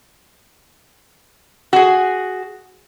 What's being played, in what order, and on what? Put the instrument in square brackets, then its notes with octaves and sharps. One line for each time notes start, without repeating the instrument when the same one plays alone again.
[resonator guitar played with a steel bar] F#4 G#4